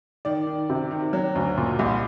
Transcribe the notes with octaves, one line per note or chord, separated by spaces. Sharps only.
D#3 D5
D#3
C3
D#3
F#3
D2
A#2
C2